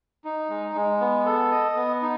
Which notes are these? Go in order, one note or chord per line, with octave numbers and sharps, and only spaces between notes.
D#4
G#3
G#3
B3
A4
D#5
B3
D#4